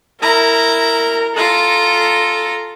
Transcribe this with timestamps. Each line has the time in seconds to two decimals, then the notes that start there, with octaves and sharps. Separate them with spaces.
0.22 E4 A#4 A#5
1.36 F4 A4 A#5